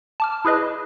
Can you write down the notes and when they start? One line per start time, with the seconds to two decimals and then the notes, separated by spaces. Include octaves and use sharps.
0.20 A5 D6 F6
0.45 E4 G#4 B4 D#5